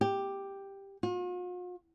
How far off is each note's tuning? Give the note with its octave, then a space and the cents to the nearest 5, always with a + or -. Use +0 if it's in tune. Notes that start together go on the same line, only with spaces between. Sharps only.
G4 +5
F4 +45